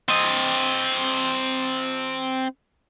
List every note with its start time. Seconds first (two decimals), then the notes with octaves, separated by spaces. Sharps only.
0.09 C4 D#5